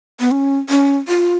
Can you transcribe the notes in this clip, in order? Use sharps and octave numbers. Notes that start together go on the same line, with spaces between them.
B3
C#4
C#4
F4